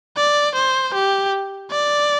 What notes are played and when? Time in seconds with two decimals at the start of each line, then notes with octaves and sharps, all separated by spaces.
0.17 D5
0.55 C5
0.94 G4
1.71 D5